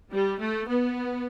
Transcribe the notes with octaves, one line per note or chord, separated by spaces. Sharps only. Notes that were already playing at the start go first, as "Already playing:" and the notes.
G3
A3
B3